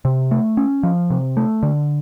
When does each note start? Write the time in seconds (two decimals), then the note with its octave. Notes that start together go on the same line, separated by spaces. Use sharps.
0.05 C3
0.31 A3
0.57 C#4
0.83 F3
1.10 C3
1.37 A3
1.63 D3